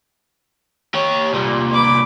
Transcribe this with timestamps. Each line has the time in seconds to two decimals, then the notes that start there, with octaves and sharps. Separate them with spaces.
0.94 G4 C#5
1.33 C2 A#2 G3
1.74 B5 D6